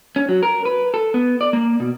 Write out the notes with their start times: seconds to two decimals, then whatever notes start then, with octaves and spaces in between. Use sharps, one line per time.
0.16 C#4
0.29 F#3
0.43 A#4
0.65 B4
0.94 A4
1.14 B3
1.41 D5
1.53 A#3
1.80 B2